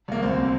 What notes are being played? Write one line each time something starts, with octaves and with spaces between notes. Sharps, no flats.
C2 A#3
D2 C4